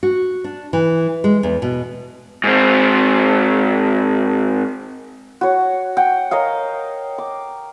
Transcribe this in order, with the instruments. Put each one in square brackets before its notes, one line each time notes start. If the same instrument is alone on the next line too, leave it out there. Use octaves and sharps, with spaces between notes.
[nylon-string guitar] F#4
D4
E3
G#3
E2
B2
[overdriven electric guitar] G#2 C4
[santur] F#4 C#5
F#5 G5
A#4 C#5 D#5 F5
D6